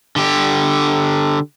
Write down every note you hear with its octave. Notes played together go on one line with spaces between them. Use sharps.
D3 G4